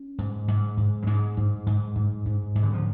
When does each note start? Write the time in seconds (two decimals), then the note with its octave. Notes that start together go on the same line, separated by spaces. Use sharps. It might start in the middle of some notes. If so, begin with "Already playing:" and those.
Already playing: C#4
0.18 G#2
0.48 G#2
0.77 G#2
1.02 F#3
1.07 G#2 G#3
1.37 G#2
1.67 G#2
1.96 G#2
2.26 G#2
2.55 G#2
2.63 D3
2.73 F3